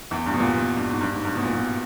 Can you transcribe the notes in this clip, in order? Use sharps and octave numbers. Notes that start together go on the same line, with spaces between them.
E2
G2
B2
A#2
B2
G2
G#2
G2
G#2
G2
B2
A#2
B2